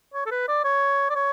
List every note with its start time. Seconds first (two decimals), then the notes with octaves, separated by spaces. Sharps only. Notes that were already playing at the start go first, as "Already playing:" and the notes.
0.14 C#5
0.26 A4
0.31 B4
0.48 D5
0.64 C#5
1.10 D5
1.15 C#5